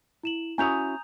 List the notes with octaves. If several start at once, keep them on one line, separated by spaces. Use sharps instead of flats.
E4 E7 F#7
C#4 E4 F#4 G#5 A#5 D#6 G6 F7